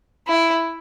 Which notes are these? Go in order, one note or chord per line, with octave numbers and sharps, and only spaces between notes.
E4